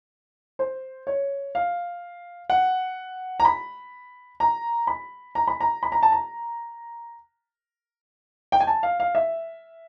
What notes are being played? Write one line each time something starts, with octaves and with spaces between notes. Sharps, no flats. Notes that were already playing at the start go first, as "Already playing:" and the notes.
C5
C#5
F5
F#5
A#5
B5
A#5
B5
A#5
B5
A#5
B5
A#5
A5
A#5
G5
G#5
A5
F5
F5
E5